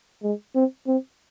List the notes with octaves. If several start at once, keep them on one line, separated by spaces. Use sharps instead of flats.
G#3
C4
C4